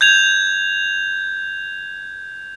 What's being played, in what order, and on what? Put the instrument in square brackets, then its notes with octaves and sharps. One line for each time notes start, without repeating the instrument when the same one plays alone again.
[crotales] G6 G#6 F7